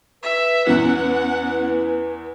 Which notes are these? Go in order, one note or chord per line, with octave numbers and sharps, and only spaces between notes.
B4 E5
E2 E3 B3 C#4 F#5